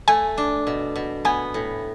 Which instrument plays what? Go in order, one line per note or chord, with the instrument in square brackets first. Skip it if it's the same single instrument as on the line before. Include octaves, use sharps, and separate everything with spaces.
[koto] A3 [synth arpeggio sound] G#5
[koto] D4
B2
B2
[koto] B3 [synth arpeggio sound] G#5
[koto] A2